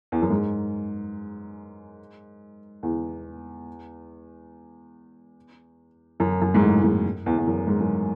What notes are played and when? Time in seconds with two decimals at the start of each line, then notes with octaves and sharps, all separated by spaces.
0.12 E2
0.22 F#2
0.30 G#2
2.83 E2
6.20 F#2
6.42 F#2
6.54 G#2
6.62 A2
6.83 G#2
7.26 E2
7.38 E2
7.47 F#2
7.67 G#2
7.80 F#2